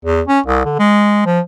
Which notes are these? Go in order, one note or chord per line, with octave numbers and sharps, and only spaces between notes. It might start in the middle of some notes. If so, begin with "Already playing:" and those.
E2
C#4
C2
D3
G#3
F3